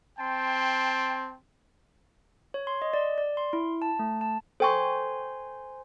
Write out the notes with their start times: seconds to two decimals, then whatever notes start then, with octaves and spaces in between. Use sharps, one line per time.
0.19 C4 G5 A5 C6
2.54 C#5
2.67 C6
2.82 D#5
2.93 D5
3.18 D5
3.37 C6
3.53 E4
3.82 A5
3.99 A3
4.21 A5
4.60 A4 C5 G5 G#5 C6 C#6